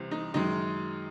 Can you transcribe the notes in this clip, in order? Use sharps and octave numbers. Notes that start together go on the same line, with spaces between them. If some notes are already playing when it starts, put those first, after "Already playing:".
Already playing: C2 C3 E3 C4
D#4
F#2 D#3 G#3 D#4